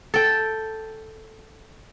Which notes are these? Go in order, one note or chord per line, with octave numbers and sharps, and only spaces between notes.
A4 G5